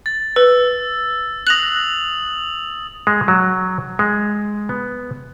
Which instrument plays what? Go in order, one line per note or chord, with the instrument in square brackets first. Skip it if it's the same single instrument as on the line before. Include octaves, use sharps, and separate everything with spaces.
[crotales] A6
[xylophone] B4 [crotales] E6
[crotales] D#6 F7 F#7 [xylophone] F#6 A#6
[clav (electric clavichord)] G#3
F#3
G#3
B3